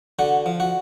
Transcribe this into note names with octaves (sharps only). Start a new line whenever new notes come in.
D3 F#4
F3
F#4